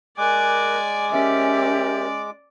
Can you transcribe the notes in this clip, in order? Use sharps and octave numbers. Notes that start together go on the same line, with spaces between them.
G#3 A#4 D5 G#5 D6 F#6
C#4 G4 A#4 D5 E5